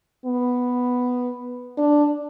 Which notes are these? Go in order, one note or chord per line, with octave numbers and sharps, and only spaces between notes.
B3
D4